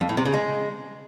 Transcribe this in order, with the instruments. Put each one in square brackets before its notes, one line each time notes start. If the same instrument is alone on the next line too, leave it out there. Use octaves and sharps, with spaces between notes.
[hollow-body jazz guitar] F2
A2
C3
C#3
G#3